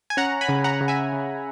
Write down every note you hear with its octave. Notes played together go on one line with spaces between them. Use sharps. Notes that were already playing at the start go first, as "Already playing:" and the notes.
G#5
C#4 F#5 A#5
G#5 B5
C#3
F#5 A#5
C#3
E5 G#5
C#3